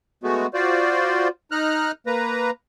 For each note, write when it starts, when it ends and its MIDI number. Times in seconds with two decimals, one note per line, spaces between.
0.23 0.47 56
0.23 0.47 57
0.23 0.47 59
0.23 0.47 66
0.54 1.28 65
0.54 1.28 66
0.54 1.28 72
0.54 1.28 74
1.51 1.92 63
1.51 1.92 82
1.51 1.92 89
1.51 1.92 90
2.07 2.50 58
2.07 2.50 71
2.07 2.50 82